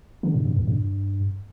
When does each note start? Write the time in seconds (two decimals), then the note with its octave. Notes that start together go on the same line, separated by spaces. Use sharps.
0.23 D3
0.34 G2
0.45 G2
0.56 E2
0.68 G2